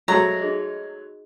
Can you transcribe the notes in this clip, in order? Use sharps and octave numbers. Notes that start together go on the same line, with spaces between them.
F#3 G#3 A3 F#4 D#5 A#5
D#4 G#4 D#5